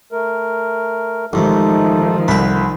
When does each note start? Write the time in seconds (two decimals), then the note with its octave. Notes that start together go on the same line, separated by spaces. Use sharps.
0.12 A3 A#4
1.33 A1 G#2 D#3 F3 A3 D#4 A4
2.28 C2 D3 B4 E5